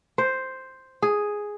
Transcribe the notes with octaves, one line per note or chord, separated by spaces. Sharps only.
C5
G#4